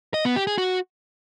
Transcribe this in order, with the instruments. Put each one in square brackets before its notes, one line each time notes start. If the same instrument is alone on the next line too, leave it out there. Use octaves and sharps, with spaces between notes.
[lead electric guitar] D#5
B3
G4
G#4
F#4